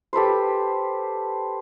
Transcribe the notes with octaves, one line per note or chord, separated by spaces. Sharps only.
G4 A4 B4 C5